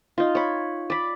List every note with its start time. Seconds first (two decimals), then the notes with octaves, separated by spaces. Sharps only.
0.18 D#4 F4
0.35 C#5 B5
0.90 D5 B5